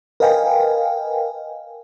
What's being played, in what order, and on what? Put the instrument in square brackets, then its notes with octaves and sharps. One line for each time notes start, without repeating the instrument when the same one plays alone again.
[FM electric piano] A#4 B4 D#5 F5 G5 G#5